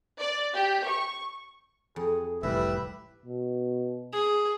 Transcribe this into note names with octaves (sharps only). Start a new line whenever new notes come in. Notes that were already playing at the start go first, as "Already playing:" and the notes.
D5
G4
C#6
F2 G#4
F1 C2 A2 E3 G3 B4 E5
B2
G#4